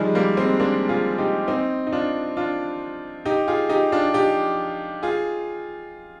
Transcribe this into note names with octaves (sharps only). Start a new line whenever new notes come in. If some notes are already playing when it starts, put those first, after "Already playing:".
Already playing: D#3 F3 G3 G#3
G3 A#3
G#3 C4
A#3 D4
F4 G#4
D#4 G4
C4 D#4
D#4
D4 F4
D4 F4
D#4 G4
F4 G#4
D#4 G4
D4 F4
D#4 G4
F4 G#4